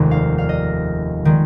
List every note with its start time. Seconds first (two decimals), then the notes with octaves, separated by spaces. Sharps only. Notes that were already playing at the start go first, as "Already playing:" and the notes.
Already playing: F1 D#2 D#3 G#3
0.11 F5
0.38 F5
0.49 D#5
1.25 D#3 G#3